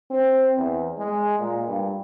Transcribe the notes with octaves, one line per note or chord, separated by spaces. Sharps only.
C4
E2
G#3
A#2
G2